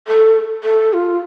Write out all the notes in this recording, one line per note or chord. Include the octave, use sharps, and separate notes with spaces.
A4
A4
F4